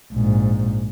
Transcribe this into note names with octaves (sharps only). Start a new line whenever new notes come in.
A#1 G#2